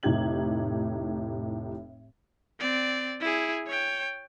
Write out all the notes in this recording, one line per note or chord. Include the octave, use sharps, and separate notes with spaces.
F1 A2 D#4 G4 G#6 F#7
C4 D5
E4 G#4
C#5 G5